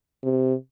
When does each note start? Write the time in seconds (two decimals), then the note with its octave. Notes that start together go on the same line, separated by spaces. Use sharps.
0.24 C3